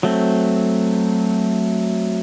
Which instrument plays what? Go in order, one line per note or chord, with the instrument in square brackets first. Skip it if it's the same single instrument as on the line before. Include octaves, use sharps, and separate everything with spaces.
[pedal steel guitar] F#3 A3 C4